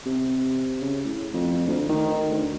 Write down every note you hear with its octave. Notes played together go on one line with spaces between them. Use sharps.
C3
C#3
A2
F2
D2
D#3
D2